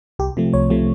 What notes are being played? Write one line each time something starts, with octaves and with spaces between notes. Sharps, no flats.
C2 G4
C3 F3 A3
C2 C#5
C3 F3 A3